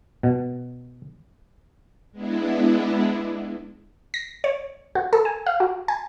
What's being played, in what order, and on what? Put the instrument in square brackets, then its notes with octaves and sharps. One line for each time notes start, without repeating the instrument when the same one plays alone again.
[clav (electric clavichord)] B2
[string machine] G#3 B3 D4 E4
[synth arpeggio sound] A#6
C#5
F#4
A4
G#5
F5
F#4
G#5